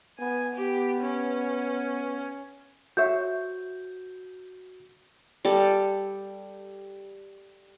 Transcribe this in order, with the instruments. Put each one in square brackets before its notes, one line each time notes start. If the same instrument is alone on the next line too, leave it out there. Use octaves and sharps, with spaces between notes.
[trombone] B3 [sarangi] G#5
[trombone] B3 [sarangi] G4
[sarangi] C#4
[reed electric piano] F#4 [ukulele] C5 C#5 E5 [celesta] G6
[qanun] G3 A4